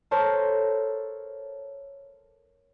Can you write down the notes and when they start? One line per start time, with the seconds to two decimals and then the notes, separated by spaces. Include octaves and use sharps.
0.11 A4 A#4 C5 C#5 A5